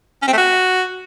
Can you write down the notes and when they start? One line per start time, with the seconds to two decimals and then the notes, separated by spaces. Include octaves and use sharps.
0.22 C#4
0.27 C4
0.33 A3
0.38 F#4